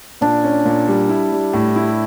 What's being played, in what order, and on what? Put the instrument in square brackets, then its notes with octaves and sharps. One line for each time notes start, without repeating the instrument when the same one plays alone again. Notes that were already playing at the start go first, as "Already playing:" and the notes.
[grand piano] A#2 [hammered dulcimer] D4
[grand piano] C#4
A#2
G3
E4
G3
A2
E4